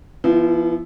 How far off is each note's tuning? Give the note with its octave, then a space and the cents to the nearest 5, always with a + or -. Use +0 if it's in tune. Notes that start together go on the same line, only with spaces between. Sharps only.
F3 -30 B3 +0 E4 +0